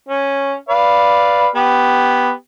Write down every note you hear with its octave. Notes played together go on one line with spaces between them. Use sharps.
C#4
B4 D5 F5
B3 G4